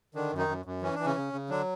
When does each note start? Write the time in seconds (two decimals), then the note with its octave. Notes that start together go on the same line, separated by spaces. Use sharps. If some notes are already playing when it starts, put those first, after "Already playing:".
0.15 D3 D#3 D4
0.33 F#2
0.38 D#3 D#4
0.48 F#2
0.65 F#2
0.82 E3 C#4
0.95 E3 D4
1.05 C#3 C#4
1.16 C#3
1.33 C#3
1.50 D3 F#3 D4